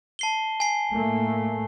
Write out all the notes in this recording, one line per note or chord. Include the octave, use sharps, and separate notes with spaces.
A5 C7 G7
G#5 C7
A2 A3 A#3